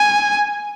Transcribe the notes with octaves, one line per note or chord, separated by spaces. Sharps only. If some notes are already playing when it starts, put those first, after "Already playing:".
Already playing: G#5